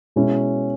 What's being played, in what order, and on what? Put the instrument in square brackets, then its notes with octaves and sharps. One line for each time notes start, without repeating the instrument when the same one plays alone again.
[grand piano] B2 G#3 C#4 E4